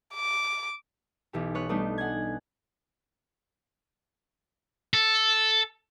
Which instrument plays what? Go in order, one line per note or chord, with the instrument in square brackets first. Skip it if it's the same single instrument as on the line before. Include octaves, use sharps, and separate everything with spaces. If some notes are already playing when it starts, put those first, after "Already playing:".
[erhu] D6
[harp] B1 E3 G4
B3 C#5 F#6
G3 A3 B3 D4 D#4
F#5 G#5 G#6
[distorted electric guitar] A4